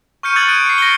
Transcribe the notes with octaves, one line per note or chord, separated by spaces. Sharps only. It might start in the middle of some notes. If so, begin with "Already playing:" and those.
C#6 F6 G6 C#7 D#7
D#6 F#6 G#6 A6 C#7 F#7
F#6 D7 D#7
C7 C#7
A#6 C#7 G7